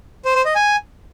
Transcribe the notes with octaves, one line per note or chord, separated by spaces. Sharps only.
C5
C5
D#5
G#5